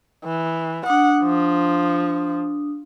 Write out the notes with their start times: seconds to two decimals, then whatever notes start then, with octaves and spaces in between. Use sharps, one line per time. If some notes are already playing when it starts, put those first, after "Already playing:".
0.25 E3
0.86 D4 F#5 D#6
1.24 F3